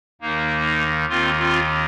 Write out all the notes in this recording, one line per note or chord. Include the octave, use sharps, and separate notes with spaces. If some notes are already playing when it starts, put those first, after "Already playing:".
D#2 D#3 A#3 D#4
D#2 D#3 C4 F4
C4 F4